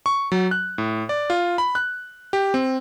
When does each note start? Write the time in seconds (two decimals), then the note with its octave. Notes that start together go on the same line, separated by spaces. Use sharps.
0.06 C#6
0.32 F#3
0.51 F#6
0.78 A2
1.09 D5
1.30 F4
1.58 B5
1.75 F#6
2.33 G4
2.54 C4